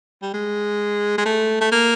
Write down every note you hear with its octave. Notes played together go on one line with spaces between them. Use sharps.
G3
G#3
G#3
A3
A3
A#3